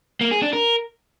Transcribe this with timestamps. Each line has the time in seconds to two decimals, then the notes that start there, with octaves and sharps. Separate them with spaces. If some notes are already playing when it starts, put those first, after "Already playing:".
0.21 A#3
0.31 G#4
0.42 D4
0.53 A#4